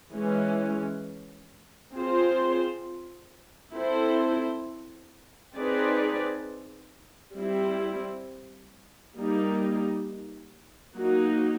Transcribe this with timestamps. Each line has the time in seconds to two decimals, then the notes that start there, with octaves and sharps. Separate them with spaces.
0.13 E3 G#3 C#4
1.93 C4 F4 G#4 C5
3.74 C4 E4 A4 C5
5.55 C4 D#4 G#4 B4 D5
7.36 G3 C4 E4
9.16 G3 A#3 D#4
10.96 F#3 A#3 D#4 F#4